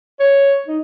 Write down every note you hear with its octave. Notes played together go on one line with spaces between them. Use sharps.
C#5
D#4